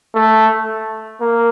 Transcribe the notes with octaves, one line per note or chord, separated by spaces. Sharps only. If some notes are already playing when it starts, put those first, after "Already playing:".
A3
A#3